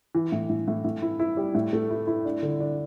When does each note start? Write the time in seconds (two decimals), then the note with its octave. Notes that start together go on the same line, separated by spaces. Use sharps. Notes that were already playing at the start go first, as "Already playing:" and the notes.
0.15 E3
0.32 A2
0.50 A2
0.68 A2
0.84 A2
1.02 E4
1.19 E4
1.37 G3
1.55 A2
1.73 A3
1.90 E4
2.07 E4
2.25 D4
2.43 D3
2.60 D4